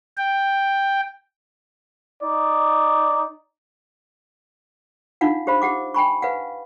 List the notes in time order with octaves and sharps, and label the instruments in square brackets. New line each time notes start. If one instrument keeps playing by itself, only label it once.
[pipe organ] G5
[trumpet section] D#4 D5
[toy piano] D4 D#4 F4 F5 F#5
G4 C5 F5 B5
G4 F#5 D6
G5 G#5 B5 C#6
B4 F5 F#5